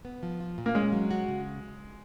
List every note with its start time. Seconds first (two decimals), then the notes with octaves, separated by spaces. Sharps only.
0.05 B3
0.23 F3
0.40 F4
0.58 A#2
0.66 A#3
0.75 G#3 C#4
0.92 F#3
1.11 F#4
1.28 C#3